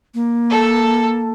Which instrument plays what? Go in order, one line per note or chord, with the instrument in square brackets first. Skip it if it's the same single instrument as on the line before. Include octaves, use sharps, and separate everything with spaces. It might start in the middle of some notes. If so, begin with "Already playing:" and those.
[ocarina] A#3
[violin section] A4